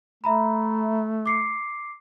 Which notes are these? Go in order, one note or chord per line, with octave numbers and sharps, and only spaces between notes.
A3 E5 A#5 B5
D6 C7 C#7